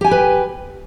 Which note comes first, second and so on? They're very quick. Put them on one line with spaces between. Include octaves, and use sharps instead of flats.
G4 G#5 G5 B4